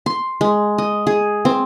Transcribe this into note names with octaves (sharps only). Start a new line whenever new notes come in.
C6
G#3
D#5
G#4
C4